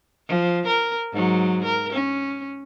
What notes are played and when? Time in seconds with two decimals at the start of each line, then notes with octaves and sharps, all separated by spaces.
0.28 F3
0.67 A#4
1.13 G#2 F#3
1.65 A#4
1.93 C#4